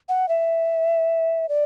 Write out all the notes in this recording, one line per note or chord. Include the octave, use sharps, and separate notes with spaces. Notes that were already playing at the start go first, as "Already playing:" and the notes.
F#5
E5
D5